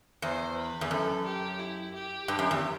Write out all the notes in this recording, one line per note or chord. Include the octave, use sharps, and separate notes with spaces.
E2 C5
B4
E2
F#2 A4
G4
E4
G4
G2
F#2
E2